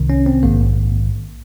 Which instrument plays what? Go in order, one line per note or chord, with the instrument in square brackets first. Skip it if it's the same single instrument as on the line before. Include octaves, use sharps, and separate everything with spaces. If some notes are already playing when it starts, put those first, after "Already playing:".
Already playing: [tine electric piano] C2 C3 D#3
C#4
C4
A#1 G#2 D#3 A#3